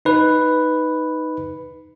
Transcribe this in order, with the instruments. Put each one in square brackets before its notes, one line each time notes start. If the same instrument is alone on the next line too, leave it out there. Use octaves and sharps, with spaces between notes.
[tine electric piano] D#4 B4